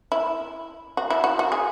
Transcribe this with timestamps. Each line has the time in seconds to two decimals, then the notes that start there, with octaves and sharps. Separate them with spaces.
0.12 E4
0.97 F#4
1.10 E4
1.24 F#4
1.39 F#4
1.52 G#4